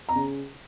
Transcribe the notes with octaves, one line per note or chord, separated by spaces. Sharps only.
A#5
C#3